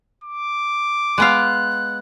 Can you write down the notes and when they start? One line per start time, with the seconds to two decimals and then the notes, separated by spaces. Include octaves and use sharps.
0.24 D6
1.18 G#3 B3 F5 F#6